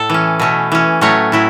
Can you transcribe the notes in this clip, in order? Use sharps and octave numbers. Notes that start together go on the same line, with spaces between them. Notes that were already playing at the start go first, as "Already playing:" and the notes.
Already playing: A2 A4
E3 C#4
B2 A3 C#4
E3 C#4
A2 F#3 A3 C#4 C#5
A2 F#3 E4